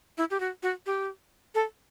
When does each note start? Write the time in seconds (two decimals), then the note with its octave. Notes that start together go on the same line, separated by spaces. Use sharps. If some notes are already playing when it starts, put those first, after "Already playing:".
0.18 E4
0.31 G4
0.40 F#4
0.63 F#4
0.86 G4
1.55 A4